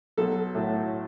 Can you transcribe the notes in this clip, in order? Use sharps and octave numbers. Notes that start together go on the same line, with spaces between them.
B1 A4
A2 F#3 A3